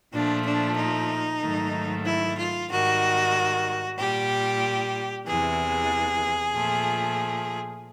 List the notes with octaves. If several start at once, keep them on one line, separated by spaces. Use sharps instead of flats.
A#2 F3 A3 D4
D4
D#4
G#2 D#3 F#3 A3
E4
F4
G#2 D#3 G3 F#4
A#2 G3 G4
E2 C3 E3 G#4
A#2 F3 A3